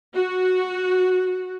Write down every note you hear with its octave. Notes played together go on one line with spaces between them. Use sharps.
F#4